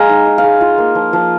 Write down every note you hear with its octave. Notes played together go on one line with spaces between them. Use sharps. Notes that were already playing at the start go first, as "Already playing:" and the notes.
Already playing: G#3 F5 G#5 A#5
D#4
D#4
F5
G#3
F4
A#3
F3
F3